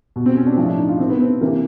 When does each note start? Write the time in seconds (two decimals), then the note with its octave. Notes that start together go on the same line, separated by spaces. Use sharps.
0.16 B2
0.26 C4
0.36 C#4
0.47 D4
0.53 C4
0.57 A2 F3 C#4
0.68 D4
0.78 D#4
0.88 F4
0.99 C3 C4
1.02 D#3
1.10 B3
1.21 C4
1.41 C3 E3 A#3